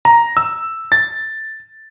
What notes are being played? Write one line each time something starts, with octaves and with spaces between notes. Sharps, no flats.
A#5
E6
A6